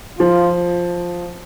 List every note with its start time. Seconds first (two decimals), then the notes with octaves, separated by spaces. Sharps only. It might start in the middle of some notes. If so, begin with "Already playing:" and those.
0.19 F3 F4